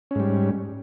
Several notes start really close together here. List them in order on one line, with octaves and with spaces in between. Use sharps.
C#4 G#2 G3